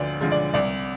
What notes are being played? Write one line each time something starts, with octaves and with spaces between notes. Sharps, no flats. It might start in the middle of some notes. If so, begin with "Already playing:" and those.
Already playing: D2 D3 F3 D5
D3 F3 G#3
D5
C2 D5